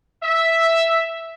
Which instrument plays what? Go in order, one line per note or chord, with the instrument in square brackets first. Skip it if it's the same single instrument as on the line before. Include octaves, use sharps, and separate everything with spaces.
[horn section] E5